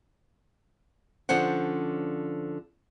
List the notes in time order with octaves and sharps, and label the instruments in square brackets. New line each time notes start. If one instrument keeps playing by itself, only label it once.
[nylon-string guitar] D3 F3 C#4 C5 F#5